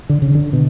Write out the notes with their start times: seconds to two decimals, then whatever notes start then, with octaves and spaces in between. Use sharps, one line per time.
0.09 D3
0.22 C#3
0.35 D3
0.53 B2